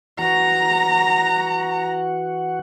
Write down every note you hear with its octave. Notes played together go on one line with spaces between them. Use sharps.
E3 F#4 F#5 A#5